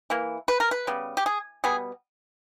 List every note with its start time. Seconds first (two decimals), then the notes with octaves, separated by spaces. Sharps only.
0.10 E3 A#3
0.48 B4
0.60 A#4
0.71 B4
0.87 C#3 G3 B3
1.17 G4
1.26 G#4
1.64 B2 G3 B3 G#4